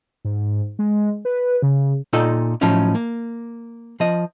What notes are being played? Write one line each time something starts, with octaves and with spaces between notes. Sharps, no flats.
G#2
G#3
B4
C#3
A#2 D#4 F4 A4 D#5 G5
A2 F3 F#3 C#4 D#4
A#3
F3 D#5